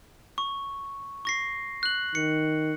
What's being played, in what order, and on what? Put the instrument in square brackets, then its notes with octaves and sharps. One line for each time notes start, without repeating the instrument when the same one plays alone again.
[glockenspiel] C#6
C#6 A#6 C7
F#6 F#7
[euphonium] D#3 [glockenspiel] C#7